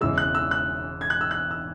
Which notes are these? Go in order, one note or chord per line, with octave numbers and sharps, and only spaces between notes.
E1 E2 C#3 E3 G#3 E6
F#6
E6
F#6
G#6
F#6
E6
F#6
E6